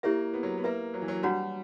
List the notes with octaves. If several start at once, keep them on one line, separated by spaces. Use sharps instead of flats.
A#3 E4 G4 C#5 E5
B3
F#3
B3
A#3 B4 E5 A#5
F#3
E3
F#3
G3 D4 F#4 C#5 F#5 A#5